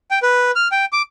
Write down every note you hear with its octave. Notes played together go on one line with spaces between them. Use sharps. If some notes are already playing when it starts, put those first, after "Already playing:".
G5
B4
F6
G5
D6